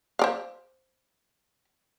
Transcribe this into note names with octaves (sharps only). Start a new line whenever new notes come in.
C5 D5 F5